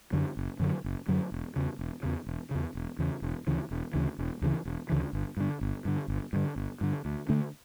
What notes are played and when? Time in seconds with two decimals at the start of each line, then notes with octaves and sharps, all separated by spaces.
0.12 F#2 D3 F#3
0.37 F#1
0.60 F#2 D3 F#3
0.84 F#1
1.08 F#2 D3 F#3
1.32 E1
1.56 E2 C#3
1.79 E1
2.03 E2 C#3
2.27 E1
2.51 E2 C#3
2.75 E1
2.99 E2 C#3
3.22 E1
3.47 D2 C#3 E3
3.71 E1
3.93 D2 C#3 E3
4.18 E1
4.42 D2 C#3 E3
4.65 E1
4.89 D2 C#3 E3
5.13 G1
5.37 G2 D3
5.61 G1
5.85 G2 D3
6.08 G1
6.33 G2 D3
6.56 G1
6.81 G2 D3
7.05 D2
7.29 D3 A3 D4